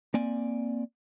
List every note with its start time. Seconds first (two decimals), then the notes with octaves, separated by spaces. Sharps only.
0.14 A#3 C4 D5 G#5